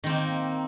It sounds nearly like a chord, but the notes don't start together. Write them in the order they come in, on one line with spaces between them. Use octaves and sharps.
D#3 C4 A#3